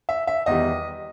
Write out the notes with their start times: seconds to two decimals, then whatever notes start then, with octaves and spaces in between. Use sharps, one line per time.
0.09 E5
0.27 E5
0.46 E2 D#3 G3 D#5